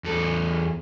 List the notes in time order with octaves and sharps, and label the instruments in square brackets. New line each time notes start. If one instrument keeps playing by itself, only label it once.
[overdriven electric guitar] E2 A4